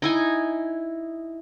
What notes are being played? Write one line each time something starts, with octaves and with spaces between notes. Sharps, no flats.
D#4 E4 G#5